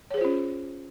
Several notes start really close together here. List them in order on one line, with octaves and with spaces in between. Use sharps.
C#5 G#4 C5 F4 C#4